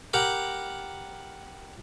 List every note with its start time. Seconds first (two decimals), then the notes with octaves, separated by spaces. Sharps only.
0.13 G4 A#4 F#5 B5